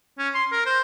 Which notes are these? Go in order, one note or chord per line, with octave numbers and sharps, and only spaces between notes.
C#4
C6
A#4
C5